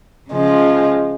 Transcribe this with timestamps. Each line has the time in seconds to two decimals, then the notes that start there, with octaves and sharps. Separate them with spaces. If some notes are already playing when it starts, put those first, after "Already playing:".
0.31 C#3 F3 G#3